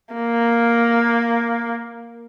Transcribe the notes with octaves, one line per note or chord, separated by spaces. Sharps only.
A#3